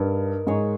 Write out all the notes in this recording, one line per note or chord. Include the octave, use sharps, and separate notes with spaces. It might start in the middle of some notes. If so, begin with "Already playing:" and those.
Already playing: G2 D#4 A#4
G#2 D#4 G#4 C#5